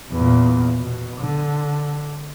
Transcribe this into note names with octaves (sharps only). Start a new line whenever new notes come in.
E2 A#2
B2
D3